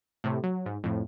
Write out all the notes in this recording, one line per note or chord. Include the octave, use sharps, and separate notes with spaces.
A2 C3
F#3
G#2
F2 A2